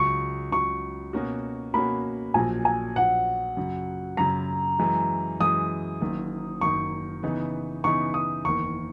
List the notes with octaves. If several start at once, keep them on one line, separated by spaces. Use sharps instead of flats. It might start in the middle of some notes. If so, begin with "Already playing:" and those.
Already playing: C#2 C#3 F#3 C#6
C#2 C#3 F#3 C#6
B2 A#3 C#4 F#4
B2 A#3 C#4 F#4 B5
A#1 A#2 F#3 G#5
G#5
A#1 A#2 F#3 F#5
F#2 C#3 F#3
F#2 C#3 F#3 A#5
F#2 E3 G#3
F#2 E3 G#3 D#6
F#1 F#2 D#3 A#3 D#4
F#1 F#2 D#3 A#3 D#4 C#6
C#3 E3 B3 D#4
C#3 E3 B3 D#4 C#6
D#6
F#1 E2 D#3 A#3 C#6